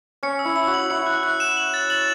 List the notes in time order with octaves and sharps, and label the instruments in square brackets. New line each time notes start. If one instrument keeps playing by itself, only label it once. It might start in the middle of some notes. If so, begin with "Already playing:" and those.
[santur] C#4 [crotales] C#7
[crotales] E6
[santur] E4
[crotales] E6
[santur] F#4
[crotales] F#7
[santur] E4 [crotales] C#7
[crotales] F#6
F#6
E7
F#7
A6
F#7